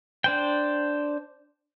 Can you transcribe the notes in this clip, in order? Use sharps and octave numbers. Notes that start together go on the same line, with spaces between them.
D4 C5 G5